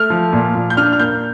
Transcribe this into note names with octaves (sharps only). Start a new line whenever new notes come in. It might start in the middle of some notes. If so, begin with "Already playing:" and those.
Already playing: A3 F6
F3
A#2
A#2
G6
D4 F6
F6
A#3 G6